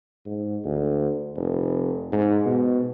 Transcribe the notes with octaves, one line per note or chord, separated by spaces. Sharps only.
G#2
D2
F1
G#2
B2